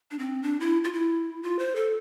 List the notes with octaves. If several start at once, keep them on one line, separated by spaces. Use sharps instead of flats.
D4
C4
D4
E4
F4
E4
F4
C5
A4